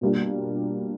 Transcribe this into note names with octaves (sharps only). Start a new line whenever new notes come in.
B2 G3 A#3 D4 F4